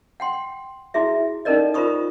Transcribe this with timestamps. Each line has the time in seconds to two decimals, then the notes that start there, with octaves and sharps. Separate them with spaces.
0.20 F#5 G5 C6
0.94 E4 F#4 G#4 E5
1.45 C#4 D#4 A4 A#4 D5 D#5
1.74 F4 A#4 C5 B5 C#6 D#6